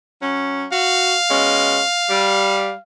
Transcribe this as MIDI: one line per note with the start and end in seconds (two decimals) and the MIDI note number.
0.22 0.66 54
0.22 0.66 61
0.72 1.14 66
0.72 2.80 77
1.30 1.81 47
1.30 1.81 56
1.30 1.81 61
2.10 2.72 55